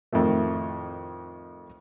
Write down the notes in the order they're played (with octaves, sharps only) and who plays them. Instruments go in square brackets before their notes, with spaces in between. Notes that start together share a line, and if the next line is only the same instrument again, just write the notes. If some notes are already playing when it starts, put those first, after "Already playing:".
[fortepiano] F2 A2 D#3 A3